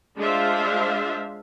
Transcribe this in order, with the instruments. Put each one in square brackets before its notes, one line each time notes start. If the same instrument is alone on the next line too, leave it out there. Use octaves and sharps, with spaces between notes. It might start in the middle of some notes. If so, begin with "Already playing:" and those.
[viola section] G#3 D4 F4 C5 E5 F5